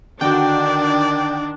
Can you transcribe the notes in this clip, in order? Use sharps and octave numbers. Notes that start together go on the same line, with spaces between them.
D3 D#3 D4 F#4 D5 G5